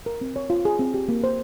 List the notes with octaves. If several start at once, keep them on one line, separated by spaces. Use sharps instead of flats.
A#4
C4
C#5
F4
G#4
C4
G4
A#3
C5